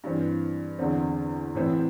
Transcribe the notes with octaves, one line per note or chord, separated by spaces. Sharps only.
G2 E3 C4
E2 D3 C4
A2 E3 C4 E4